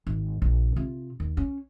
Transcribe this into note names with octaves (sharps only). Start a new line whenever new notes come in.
G#1
A#1
C3 F4
D#2
C#4